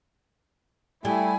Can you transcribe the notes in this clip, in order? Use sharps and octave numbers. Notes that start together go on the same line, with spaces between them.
G3 A3 E4 G#5